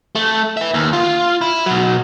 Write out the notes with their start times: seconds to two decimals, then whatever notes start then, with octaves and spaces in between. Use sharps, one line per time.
0.15 A3
0.57 B4 E5
0.74 D#2
0.93 F4
1.41 E4
1.66 B2 F#3